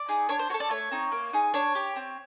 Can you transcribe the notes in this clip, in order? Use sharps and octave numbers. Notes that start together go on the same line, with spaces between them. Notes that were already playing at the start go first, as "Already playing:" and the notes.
Already playing: D5
D#4 G#4
D4 C#5
C5
F#4 A4 C#5
D5
A3 C#5
C4 D#4
A#3
D#4 G#4
D4 C#5
G4
C4